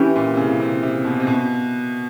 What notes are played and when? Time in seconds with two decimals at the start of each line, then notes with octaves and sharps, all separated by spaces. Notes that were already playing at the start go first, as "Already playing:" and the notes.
Already playing: E3 C#4 E4 G4
0.16 A#2
0.33 C3
0.37 C#3
0.60 C3
0.83 C3
1.04 B2
1.20 C3
1.27 B2